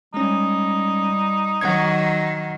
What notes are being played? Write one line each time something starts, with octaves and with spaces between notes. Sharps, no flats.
G3 G#3 C#4 D#4
D#3 F#3 F#5 G#6